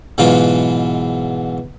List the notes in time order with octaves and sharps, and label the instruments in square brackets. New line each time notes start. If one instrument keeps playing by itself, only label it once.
[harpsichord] G#2 B2 E3 F#3 F4